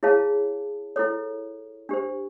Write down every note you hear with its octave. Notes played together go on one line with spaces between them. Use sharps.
E4 G#4 C#5 F5 A5
E4 A4 C#5
D4 G4 C5